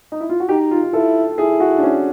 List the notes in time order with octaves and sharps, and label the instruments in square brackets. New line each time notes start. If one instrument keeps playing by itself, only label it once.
[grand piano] D#4
E4
F4
F#4
[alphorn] D#4 [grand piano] G4
[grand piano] F4
[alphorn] E4 [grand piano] A4
[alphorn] E4 [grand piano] G#4
[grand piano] F#4
D4
C#4